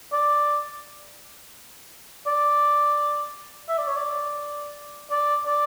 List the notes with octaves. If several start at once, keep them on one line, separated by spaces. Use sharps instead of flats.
D5
D5
E5
D5
C#5
D5
D5
D5